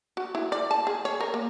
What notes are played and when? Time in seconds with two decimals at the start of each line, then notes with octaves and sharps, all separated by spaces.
0.17 F#4
0.35 E4
0.52 D5
0.71 A5
0.87 G#4
1.05 C#5
1.20 A#4
1.34 A#3